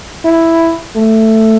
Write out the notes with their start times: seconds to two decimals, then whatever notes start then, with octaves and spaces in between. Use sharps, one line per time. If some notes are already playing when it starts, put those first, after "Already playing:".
0.25 E4
0.96 A3